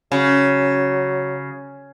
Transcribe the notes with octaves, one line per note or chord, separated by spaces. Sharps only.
C#3 F#3